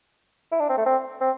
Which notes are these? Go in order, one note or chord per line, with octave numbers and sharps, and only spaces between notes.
E4
D4
C4
A3
C4
C4